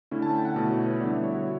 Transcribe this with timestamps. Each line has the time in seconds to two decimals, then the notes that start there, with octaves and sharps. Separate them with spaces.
0.11 D3 A3 C#4 E4
0.22 A5
0.34 G5
0.45 F#5
0.56 B2 A3 E4 D5
0.71 C#5
0.86 B4
1.01 D3 G3 B3 E4 D5
1.11 E5
1.24 C#5
1.34 F#4